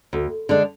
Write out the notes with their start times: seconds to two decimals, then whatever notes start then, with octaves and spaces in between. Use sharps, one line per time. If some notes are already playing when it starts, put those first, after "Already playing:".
0.13 D2
0.49 D3 G#3 D4